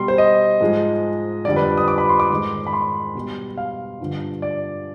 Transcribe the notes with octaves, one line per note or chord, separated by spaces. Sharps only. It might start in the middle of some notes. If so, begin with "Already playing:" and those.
Already playing: B2 G3 C6
C5
D#5
G#2 F3 G#3
F2 D3 G3 D5
B4
D#6
D6
B5
C6
D6
G#2 D#3 G#3
B5
C6
B2 G3
F5
G2 D3 F3
D5